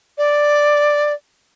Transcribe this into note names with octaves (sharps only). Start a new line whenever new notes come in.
D5